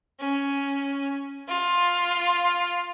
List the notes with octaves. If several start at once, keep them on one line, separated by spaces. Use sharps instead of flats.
C#4
F4